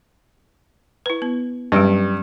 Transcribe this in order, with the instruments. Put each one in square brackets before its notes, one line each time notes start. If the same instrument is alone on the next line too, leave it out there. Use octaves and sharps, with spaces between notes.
[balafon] E4 B4
B3
[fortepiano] G2 [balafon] F#3 G3 C#4